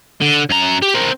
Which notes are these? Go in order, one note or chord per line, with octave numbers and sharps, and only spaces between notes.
D3
F#2 A#5
G4
C4 A#4